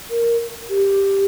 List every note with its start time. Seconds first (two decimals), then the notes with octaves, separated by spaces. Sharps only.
0.10 A#4
0.69 G4